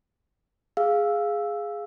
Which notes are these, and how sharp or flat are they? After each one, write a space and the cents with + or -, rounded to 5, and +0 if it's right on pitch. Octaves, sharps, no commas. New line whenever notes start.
G#4 +0 F5 +0 E6 +0